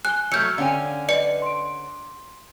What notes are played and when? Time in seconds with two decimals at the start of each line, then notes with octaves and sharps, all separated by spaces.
0.05 G#5 F#6 G7
0.32 F#3 A3 E6 F6 G6 C#7
0.58 D3 C#4 F5 G5 G#5
1.09 B4 D5 D#5 C#7
1.42 C6 D7